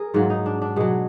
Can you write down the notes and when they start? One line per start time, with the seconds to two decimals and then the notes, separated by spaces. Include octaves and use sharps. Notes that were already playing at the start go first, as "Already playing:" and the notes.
Already playing: G#4 A#4
0.14 G#2 F#3 F4
0.30 D#4
0.46 D4
0.62 D4
0.76 B2 F#3 G#3